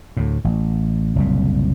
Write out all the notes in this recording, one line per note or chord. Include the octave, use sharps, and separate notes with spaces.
D2 A2
A1
F#1 C2 A#2